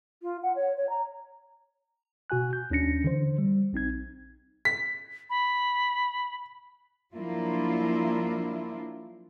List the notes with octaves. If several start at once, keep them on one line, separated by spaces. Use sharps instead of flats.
F4
F#5
C#5
C#5
A#5
B2 F#4 G#5 F#6
G6
D#2 C#4 D4 A#6 C#7
D3 E3 C5
G3
A#1 C4 D#4 G#6
B6
B5
F3 F#3 A#3 D4 E4 F4